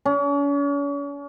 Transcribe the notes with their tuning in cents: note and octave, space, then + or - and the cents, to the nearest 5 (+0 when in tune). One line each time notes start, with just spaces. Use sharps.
C#4 +40